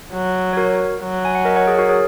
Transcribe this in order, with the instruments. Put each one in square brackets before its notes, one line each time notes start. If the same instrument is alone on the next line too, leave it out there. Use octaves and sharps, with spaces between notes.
[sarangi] F#3
[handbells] C#5
F#4 A#4
[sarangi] F#3
[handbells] G#5
F#5
A#4 D#5
C#5 F#5
G#4
F#4 A#4
G#4 C#5